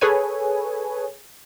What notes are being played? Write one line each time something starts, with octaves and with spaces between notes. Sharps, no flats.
G#4 A4 B4 C#5 G#5